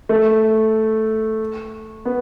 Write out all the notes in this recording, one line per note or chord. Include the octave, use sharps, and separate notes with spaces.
A3
B3